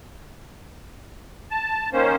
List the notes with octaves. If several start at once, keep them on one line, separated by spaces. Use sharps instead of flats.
A5
D#3 A#3 C#4 C5